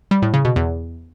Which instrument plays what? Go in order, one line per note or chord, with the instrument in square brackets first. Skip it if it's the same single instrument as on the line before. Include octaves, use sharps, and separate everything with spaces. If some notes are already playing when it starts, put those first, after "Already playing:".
[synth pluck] G3
A2
C#3
B2
E2